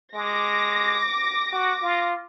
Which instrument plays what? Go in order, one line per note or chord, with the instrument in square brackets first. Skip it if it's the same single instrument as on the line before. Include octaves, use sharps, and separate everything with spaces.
[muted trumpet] G#3 [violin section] D6 A#6
[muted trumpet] F#4
F4